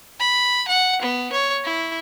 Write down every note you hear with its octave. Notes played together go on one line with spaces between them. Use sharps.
B5
F#5
B3
C#5
E4